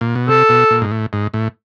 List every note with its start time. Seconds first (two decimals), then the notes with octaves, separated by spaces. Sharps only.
0.01 A#2
0.15 B2
0.28 C3 A4
0.49 B2
0.71 A#2
0.82 G#2
0.91 A2
1.13 G#2
1.34 A2